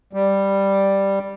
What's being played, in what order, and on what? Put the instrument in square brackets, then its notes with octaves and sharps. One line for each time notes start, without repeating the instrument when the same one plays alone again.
[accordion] G3